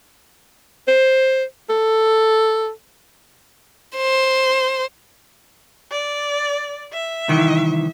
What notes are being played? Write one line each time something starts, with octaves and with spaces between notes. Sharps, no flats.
C5
A4
C5
D5
E5
C2 D#3 E3